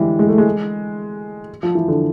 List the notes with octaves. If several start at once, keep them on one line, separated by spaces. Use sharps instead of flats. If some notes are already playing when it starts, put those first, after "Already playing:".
Already playing: D3 E3 G3 G#3
G#3
A3
G#3
F3
E3
D3